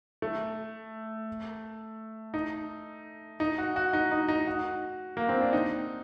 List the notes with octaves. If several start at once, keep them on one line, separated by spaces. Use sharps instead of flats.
A3
D#4
D#4
F#4
F#4
D#4
D#4
D#4
F#4
A#3
C4
D4
D#4